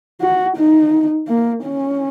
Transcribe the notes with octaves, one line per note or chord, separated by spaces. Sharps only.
F#4
D#4
A#3
C#4